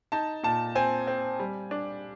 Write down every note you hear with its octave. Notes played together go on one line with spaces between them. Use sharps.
D#4 A5
A#2 A5
C4 G#5
C4
G3
D4